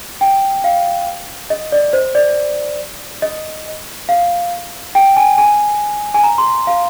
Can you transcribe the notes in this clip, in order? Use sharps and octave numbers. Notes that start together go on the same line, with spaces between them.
G5
F5
D#5
D5
C5
D5
D#5
F5
G5
G#5
G#5
G#5
A#5
C6
F5